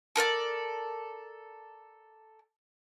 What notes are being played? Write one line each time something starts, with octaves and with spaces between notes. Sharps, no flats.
A4 A#4 C5 D5